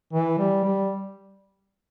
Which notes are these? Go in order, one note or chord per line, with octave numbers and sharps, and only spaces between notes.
E3
G3
G3